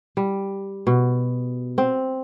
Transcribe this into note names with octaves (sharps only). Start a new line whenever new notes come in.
G3
B2
C4